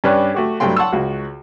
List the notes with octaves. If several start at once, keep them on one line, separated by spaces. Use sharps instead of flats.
G2 C#4 D4 G4 B4 F#6
A3 F#4 G4
C2 G2 F#3 A3 G5 C6
F#5 A5 C6 C#6 E6
C#2 F#4